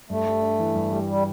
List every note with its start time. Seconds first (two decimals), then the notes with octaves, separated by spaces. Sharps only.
0.10 G2 A3
0.26 G3
0.42 D4
0.59 E3
0.75 G2
0.92 G3
1.09 G3